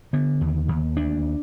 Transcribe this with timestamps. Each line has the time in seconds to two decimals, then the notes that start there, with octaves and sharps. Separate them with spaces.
0.13 D3 B3
0.41 D#2
0.69 D#2
0.96 D2 D4